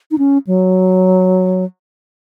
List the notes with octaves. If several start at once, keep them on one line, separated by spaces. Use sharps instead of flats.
D#4
C#4
F#3